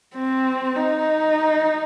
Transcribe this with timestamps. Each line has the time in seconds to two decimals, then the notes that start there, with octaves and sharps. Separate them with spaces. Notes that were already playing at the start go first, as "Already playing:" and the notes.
0.14 C4
0.76 D#4